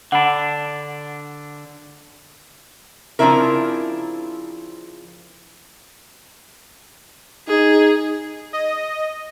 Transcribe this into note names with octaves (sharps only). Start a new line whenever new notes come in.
D3 D4 F#5 B5
C#3 F3 C4 D4 E4 A#4
D#4 G#4
D#5